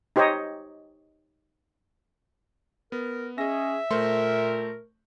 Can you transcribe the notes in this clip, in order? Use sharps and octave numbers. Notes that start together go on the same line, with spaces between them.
D#4 G4 C5 C#5 D#5
B3 A#4
C#4 G#4 D#5 E5 A#6
A#2 A3 A#4 C5 C6